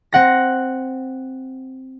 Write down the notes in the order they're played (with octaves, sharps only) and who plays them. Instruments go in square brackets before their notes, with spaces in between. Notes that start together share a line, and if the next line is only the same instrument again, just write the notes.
[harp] C4 F#5 A#6